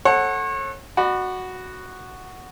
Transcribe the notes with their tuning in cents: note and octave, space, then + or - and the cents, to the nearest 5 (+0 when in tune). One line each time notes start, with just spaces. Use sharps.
A4 +0 C#5 -35 F#5 +0
F#4 +0 D5 +45 B5 +0